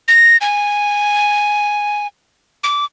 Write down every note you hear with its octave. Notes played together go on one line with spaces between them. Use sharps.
A#6
G#5
D6